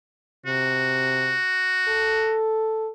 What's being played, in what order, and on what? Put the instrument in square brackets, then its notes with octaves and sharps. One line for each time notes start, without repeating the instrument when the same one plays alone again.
[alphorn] C3 [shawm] F#4
[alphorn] A4